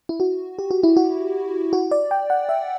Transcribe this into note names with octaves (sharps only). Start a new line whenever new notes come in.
E4
F#4
G4
F#4
E4
F#4
F#4
D5
G5
F#5
E5